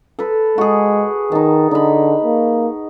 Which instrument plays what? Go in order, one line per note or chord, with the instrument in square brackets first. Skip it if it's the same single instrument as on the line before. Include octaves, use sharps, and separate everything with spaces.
[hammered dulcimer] A4 B4
[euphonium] G#3 [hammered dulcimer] F#4 G#4
[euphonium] D#3 [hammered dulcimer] D#4 A5
[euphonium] D3 [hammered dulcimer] D#4 B5
[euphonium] A#3